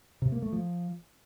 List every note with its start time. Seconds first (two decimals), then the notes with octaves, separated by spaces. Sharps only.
0.22 C3
0.32 A#3
0.42 A3
0.52 F3